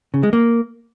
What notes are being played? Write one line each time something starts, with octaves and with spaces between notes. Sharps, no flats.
C#3
G#3
A#3